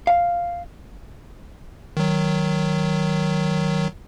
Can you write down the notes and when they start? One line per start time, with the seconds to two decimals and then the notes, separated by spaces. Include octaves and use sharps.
0.07 F5
1.97 D#3 F#3